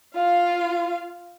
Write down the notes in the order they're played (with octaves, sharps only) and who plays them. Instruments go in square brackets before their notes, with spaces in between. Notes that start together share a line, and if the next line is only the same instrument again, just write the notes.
[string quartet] F4 F5